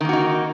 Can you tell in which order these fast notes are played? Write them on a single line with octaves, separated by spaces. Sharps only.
D#3 A#3 F#4 D#4